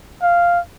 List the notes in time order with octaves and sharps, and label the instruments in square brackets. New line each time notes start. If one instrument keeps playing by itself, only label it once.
[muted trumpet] F5